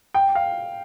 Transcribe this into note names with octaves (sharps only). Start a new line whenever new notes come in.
G5
F5